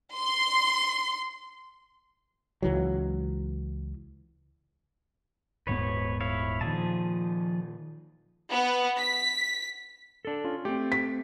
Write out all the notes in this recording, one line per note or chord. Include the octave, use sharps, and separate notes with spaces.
C6
C#2 E3 F#3
D#1 G#2 B3 B4 C#5
E4 C#5 F5
A#2 D#3 F3 G#4 A5
B3
B6
D4 A4
C#4 F4
A3 C4 G4
B6